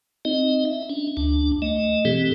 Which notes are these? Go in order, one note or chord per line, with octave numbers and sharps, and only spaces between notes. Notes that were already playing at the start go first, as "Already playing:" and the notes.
C4 D#4 D#5
E5
C#4 D4
D2 D4
A3 D#5
B2 E3 C4 G4 A4